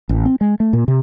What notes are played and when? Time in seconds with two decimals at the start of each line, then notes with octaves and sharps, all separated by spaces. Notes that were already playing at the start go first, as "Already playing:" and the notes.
0.09 A1
0.25 C4
0.41 G#3
0.60 A3
0.73 A#2
0.88 C3